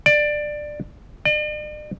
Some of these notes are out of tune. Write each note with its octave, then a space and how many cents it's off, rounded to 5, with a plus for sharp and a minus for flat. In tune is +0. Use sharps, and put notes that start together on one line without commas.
D5 +15
D5 +45